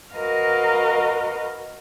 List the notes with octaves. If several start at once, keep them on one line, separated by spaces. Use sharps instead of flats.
F#4 A#4 B4 D#5 F5